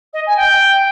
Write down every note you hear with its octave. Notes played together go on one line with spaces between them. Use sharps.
D#5
G#5
G5